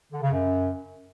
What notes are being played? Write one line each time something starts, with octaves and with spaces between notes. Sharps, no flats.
D3
C#3
F#2